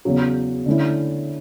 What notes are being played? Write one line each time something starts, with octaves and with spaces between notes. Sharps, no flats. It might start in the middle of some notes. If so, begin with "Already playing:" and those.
E2 C#3 F#3
D3 A3 C#4 E4